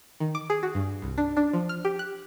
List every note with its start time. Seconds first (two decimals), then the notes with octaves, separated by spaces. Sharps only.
0.20 D#3
0.35 D6
0.50 G#4
0.63 F#4
0.75 G2
1.02 C2
1.18 D4
1.37 D4
1.53 F3
1.69 F6
1.85 G4
1.99 F#6